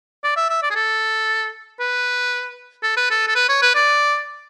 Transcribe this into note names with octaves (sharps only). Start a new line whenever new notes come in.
D5
E5
E5
D5
G#4
A4
B4
A4
B4
A4
A4
B4
C#5
B4
D5